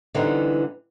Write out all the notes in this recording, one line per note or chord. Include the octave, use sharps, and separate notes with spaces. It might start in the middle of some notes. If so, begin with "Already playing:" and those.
D3 E3 G3 B3 C4 D#4